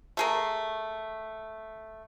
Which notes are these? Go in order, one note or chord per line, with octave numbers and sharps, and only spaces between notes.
A3 G#4 A#4